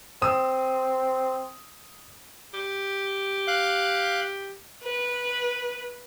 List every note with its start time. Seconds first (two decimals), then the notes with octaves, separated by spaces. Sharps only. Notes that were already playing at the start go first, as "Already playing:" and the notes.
0.22 C4 D#6 E6
2.54 G4
3.48 F5 F#6
4.83 B4